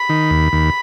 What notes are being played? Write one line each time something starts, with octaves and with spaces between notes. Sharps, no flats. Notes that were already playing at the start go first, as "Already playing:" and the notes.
Already playing: B5
D#3
D#2
D#2